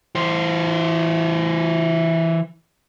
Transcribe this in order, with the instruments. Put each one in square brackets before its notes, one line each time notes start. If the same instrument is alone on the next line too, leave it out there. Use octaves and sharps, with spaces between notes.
[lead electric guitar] E3 C5